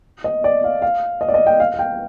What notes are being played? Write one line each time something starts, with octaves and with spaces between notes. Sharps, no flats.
D#5
D5
F5
F5
D#5
D5
D#5
G5
F5
F5
G5